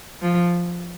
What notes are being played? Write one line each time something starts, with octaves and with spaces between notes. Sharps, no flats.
F3